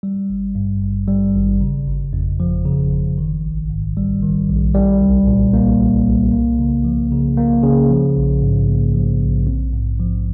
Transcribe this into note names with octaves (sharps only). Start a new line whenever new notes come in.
G3
G#1
G2
G#1
G3
G#1
C#3
G1
F2
F3
C#3
G1
D#3
A#1
G#2
G3
D#3
A#1
G3
C2
A#2
A#3
G3
C2
A#3
C#3
F3
C#3
A#3
C#3
F3
A#1
G#2
A#3
F3
A#1
C4
G#2
F3